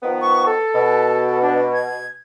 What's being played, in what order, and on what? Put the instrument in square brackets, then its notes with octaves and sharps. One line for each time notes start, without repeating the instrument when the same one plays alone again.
[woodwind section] D#3 F3 B3
[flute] C#6
A4
[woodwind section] B2
[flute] D4
G#6